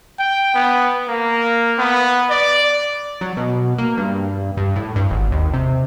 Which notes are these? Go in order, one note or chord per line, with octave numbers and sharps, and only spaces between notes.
G5
B3
A#3
B3
D5
F#3
B2
A#3
G2
G2
A2
G2
G#1
D#2
C3